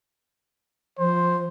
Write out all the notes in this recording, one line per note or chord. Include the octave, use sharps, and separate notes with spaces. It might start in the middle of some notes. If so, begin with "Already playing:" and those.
F3 C5